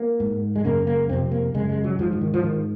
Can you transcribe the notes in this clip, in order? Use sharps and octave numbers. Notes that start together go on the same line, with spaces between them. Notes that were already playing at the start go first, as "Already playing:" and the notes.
Already playing: A#3
G#2
G#3
F#2 C#3 A#3
A#3
F2 C3 C4
A#3
F#2 C#3 G#3
G#3
F#3
G#2 F3
F3
D#3
F3
G#2 D#3